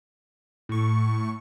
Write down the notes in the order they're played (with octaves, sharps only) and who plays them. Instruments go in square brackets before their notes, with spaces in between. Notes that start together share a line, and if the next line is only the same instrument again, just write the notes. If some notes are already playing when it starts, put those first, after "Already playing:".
[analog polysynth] A2 C#6